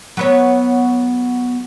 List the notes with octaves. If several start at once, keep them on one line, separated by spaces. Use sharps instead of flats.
F#3 B3 C#5